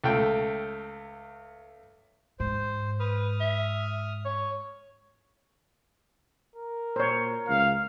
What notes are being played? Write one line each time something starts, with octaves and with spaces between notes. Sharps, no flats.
C#2 A3 G5
G#2 C5
B4 D#6 F6
E5
C#5
A#4
A#2 C5 C#5
C#2 F5